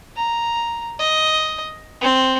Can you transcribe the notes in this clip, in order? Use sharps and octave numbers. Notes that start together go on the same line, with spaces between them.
A#5
D#5
C4